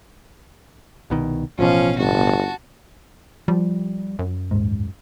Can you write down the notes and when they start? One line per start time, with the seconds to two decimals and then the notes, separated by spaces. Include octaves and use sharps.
1.10 C2 B2 D#3
1.59 A1 B2 F3 C#4 F5
1.98 G1 F#4 A5
3.48 F3 G3
4.19 F#2
4.51 D#1 G#2